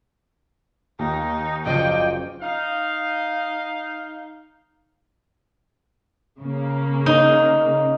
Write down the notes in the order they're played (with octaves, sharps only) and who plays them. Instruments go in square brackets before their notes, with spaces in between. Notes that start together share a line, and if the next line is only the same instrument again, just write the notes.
[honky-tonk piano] D#2 [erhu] D#4
[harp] F#1 F4 C#7 [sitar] F3 D5 D#5 [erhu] G5
[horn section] D#4 F5
[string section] C#3 A#3
[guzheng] D#4